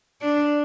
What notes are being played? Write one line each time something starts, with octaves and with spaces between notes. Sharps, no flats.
D4